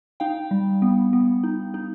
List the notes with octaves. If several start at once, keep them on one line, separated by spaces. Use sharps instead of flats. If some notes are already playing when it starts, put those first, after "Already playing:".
D#4 F5 G5
G3
B3
B3
D#4
D#4